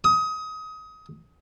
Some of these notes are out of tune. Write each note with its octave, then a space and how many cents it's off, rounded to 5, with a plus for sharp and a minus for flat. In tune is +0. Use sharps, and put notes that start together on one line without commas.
D#6 +25